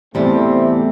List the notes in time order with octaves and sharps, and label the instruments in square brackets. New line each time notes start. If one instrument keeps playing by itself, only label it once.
[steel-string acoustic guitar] E2 [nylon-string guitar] C3 G3 [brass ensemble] A3 C4